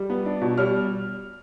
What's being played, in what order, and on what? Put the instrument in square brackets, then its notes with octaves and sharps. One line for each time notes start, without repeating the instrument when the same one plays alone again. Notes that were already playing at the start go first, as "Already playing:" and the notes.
Already playing: [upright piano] G3
B3
D4
B2
G3 F6